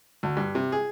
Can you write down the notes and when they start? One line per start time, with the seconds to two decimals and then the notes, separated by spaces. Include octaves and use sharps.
0.23 D2
0.37 G2
0.55 C3
0.72 G#4